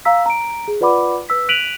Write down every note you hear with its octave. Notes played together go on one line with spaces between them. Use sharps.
F5 A#5 E6 B6
A#5 D7
G#4
F4 B4 D5 F#5 B5 D6
B4 E6 B6
F#6 B6 D7 D#7 F7 F#7